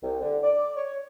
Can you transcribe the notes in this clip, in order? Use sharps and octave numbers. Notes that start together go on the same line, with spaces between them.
C2
D3
D5
C#5